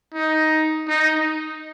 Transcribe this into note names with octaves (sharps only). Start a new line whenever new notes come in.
D#4
D#4